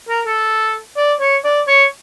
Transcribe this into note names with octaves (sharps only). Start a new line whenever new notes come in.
A#4
A4
D5
C#5
D5
C#5